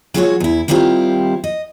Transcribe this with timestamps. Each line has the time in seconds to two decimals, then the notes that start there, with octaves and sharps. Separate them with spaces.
0.14 F#3 G#3 F4 F#4 A#4 C#5
0.40 E2 E4
0.68 D#3 G3 C4 E4 F4 G4
1.44 D#5